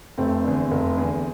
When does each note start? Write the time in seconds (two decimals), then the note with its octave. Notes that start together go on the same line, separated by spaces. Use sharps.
0.18 F1 A3 C4
0.45 E2 D3
0.71 F1
0.97 E2 D3